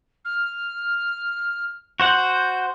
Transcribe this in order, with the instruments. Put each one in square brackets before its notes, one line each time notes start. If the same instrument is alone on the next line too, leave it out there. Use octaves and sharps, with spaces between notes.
[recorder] F6
[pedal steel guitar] F#4 C5 F#5 [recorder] G6